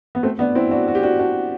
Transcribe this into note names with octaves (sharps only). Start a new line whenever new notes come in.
B3
A3 C4
B3 D4
C4 E4
D4 F#4
F#4
G4
D4 F#4
D4 F#4